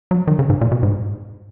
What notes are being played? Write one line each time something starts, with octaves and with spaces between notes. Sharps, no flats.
F#3
D#3
C#3
G#2
A#2
B2
G#2